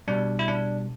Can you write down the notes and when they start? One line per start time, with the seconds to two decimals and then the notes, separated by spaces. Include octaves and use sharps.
0.08 B2 G3 D4
0.39 E4
0.48 D4